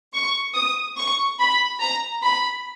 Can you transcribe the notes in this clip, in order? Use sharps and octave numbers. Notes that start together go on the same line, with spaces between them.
C#6
D#6
C#6
B5
A#5
B5